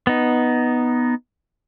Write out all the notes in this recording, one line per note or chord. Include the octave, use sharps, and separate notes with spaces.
B3 D#4